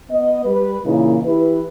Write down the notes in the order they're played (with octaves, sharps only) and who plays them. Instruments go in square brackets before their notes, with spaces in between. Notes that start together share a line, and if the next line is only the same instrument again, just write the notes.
[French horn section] B3 D#5
G3 G4 B4
A#2 C#3 E3 A#3 D#4 E4
E3 E4 G4 B4